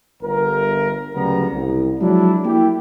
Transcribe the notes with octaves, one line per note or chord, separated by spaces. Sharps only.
G1 A#4
D2 C#3 F#3 G3 B3 A#5
C2
F3 F#3 G#3 D4 E4
A#3 E4 G4